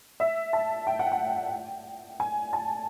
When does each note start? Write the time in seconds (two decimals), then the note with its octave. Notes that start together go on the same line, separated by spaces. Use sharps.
0.20 E5
0.53 A5
0.87 G5
0.99 F#5
1.12 G5
2.20 G#5
2.53 A5